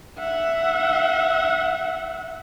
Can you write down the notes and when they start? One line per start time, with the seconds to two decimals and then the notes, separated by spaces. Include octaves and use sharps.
0.19 E5 F#5